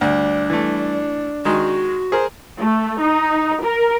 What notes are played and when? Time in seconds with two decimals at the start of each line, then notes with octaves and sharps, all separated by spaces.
0.01 D2 G3 D4
0.50 E3 A3
1.45 D#3 G#3 F#4
2.12 G#4 A#4 C5
2.60 A3
3.01 D#4
3.64 A#4